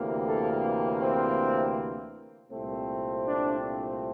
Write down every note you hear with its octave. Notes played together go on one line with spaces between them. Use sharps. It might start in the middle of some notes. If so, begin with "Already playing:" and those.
Already playing: D2 C3 E3 A#3
A4
C4
C2 A#2 A3 C4
D4